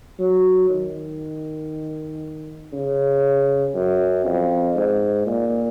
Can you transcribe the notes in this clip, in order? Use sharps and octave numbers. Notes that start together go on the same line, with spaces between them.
F#3
D#3
C#3
F#2
F2
G#2
A#2